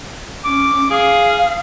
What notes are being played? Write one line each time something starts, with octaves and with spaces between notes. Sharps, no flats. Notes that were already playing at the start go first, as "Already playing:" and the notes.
C#4 D6
G#4 F5